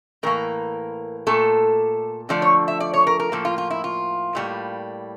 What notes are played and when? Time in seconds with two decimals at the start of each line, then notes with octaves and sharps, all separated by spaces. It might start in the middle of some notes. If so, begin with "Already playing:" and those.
0.23 A2 E3 A#3 A#4
1.27 A#2 A3 A4
2.29 D3 F3 A3 D5
2.42 C#5
2.68 E5
2.80 D5
2.94 C#5
3.07 A#4
3.20 A#4
3.32 A2 F3 A#3 A4
3.45 F4
3.58 F4
3.70 E4
3.84 F4
4.35 A2 G3 A#3